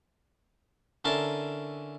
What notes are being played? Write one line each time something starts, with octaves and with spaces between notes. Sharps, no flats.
D3 C#4 E4 A#4 A5 C6